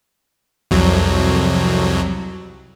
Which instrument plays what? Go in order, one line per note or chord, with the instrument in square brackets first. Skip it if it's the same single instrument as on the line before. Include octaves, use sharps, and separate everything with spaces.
[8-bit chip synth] C2 F2 F#3